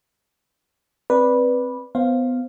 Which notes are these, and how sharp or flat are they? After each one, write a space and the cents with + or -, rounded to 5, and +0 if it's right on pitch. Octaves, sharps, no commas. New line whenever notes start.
C4 +0 B4 -10 D5 +0
B3 +20 C5 +20 F5 +0